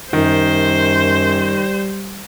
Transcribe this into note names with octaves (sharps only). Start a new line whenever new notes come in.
F#2 D#3 G3 C5